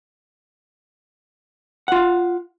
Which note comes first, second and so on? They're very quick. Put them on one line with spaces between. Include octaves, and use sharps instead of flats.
F#5 F4 F5